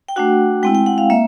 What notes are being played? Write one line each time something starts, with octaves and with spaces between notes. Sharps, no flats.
G5
A3 D4 F#4 F#5
G#3 C4 E4 G5
G5
F#5
F5
A#3 E5